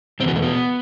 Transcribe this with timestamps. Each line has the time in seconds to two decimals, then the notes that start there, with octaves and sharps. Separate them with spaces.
0.20 E2 B2 C4
0.28 B3
0.35 A3
0.42 B3